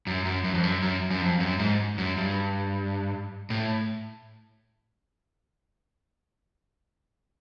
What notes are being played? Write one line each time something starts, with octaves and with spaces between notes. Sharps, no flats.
F#2
F#2
F#2
F2
F#2
F#2
F#2
F2
F#2
G#2
F#2
G2
A2